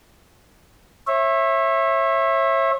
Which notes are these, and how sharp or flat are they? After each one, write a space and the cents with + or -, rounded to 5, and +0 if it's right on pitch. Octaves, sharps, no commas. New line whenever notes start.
C#5 -35 E5 +0